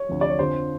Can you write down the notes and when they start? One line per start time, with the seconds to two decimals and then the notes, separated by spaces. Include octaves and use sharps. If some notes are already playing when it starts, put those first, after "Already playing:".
Already playing: C#5
0.09 D2 C3 F3
0.21 D5
0.30 C#5
0.39 F2 D3 F3 C5